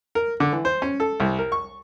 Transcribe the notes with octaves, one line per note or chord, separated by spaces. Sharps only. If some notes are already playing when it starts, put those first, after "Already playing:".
A#4
D3
E3
C5
C#4
A4
C2
A#4
C#6